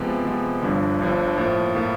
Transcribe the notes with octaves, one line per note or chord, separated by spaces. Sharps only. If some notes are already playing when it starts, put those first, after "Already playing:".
Already playing: C3 F3 G#3 B3
C3 F3 G#3 B3
G1 G2 D3 F3
G1 G2 D3 F3
A2 F3 A#3
A2 F3 A#3